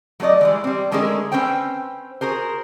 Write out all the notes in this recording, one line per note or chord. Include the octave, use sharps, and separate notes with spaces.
F#3 A3 G#4 D5 D#5
E3 G3 G#3
G3 C4
D3 G#3 A3 C#4 G#4 A#4
C4 C#4 B4 C5 G5
F#4 G#4 A#4 C5